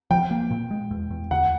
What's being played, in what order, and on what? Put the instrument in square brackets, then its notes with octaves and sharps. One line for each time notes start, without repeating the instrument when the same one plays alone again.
[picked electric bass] F3 [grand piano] G5
[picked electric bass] A#3
A#2
G#3
E2
E2
[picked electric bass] D2 [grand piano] F#5